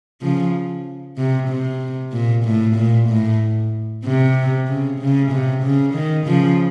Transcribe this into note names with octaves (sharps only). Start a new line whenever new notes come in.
C#3 F3
C3
C3
A#2
A2
A#2
A2
C3
C#3
C#3
C3
C#3
D#3
C#3 F3